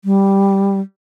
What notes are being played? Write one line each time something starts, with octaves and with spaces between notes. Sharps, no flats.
G3